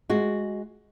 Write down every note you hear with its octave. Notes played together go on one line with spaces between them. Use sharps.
G#3 F#4